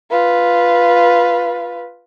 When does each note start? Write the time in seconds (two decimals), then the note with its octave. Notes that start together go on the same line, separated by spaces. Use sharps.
0.10 F4 B4